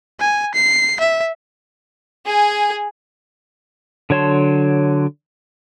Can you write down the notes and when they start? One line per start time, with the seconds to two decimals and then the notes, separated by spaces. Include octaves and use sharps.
0.20 G#5
0.55 C7
1.00 E5
2.26 G#4 G#5
4.10 D3 F#3 C#5 A5 C6